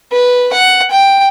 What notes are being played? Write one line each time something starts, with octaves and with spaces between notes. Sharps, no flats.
B4
F#5
G5